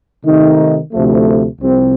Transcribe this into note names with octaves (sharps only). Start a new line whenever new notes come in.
C3 D#3 A3 D#4
D2 C3 F3 A3
C2 C3 F3 C4